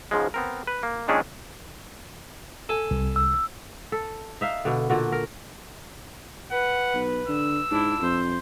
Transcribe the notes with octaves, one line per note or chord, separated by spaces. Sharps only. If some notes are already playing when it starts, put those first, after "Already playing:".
G#2 C#3 F3 G#3
B3 C4 A#4
B4
A#3
A#2 D#3 G#3 C#4 D4 G#4
A4 G#5
C2
E6
A4
D#4 E5 F5
B2 D3
A#2 D3 F#4
A#4
B4 F#5
B1
D3 E6
G#2 D4 E4
F2 C5